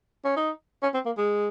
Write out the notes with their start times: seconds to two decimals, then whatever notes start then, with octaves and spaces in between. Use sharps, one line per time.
0.25 C#4
0.36 D#4
0.83 C#4
0.94 C4
1.06 A#3
1.18 G#3